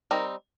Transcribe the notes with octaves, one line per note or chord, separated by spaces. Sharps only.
G3 C4 D#4 A#4